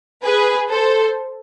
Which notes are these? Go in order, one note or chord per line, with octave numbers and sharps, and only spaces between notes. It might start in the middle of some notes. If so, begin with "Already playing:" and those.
G#4 B4
A4 C5